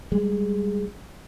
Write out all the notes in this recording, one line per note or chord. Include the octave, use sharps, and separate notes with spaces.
G3 G#3